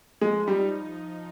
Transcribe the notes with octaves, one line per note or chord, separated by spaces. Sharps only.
F3 G#3
G3 D#4